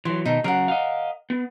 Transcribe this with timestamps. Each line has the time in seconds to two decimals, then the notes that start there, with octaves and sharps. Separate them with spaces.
0.05 E3 F#3 C6
0.26 B2 D#3 D#4 A4
0.44 C#3 F#3 A#4 F#5
0.68 D#5 F5
1.30 B3